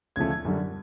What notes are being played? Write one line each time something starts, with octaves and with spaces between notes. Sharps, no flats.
D2 C#3 F3 A3 G#6
G#6
F#2 D3 G3